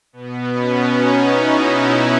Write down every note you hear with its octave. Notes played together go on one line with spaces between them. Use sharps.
B2 B3
C#4
D#4
E4